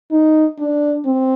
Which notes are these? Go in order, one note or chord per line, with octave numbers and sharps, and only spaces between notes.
D#4
D4
C4